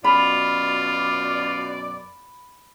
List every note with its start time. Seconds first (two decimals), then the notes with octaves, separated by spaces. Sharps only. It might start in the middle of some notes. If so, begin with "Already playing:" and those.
0.04 F#2 B2 F4 D5 B5